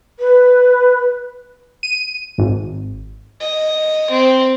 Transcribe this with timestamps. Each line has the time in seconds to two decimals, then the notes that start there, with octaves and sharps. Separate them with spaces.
0.20 B4
1.83 D#7
2.38 G#1
3.40 D#5
4.11 C4